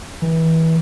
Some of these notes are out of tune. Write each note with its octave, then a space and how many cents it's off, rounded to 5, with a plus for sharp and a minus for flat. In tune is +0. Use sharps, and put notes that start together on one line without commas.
E3 -25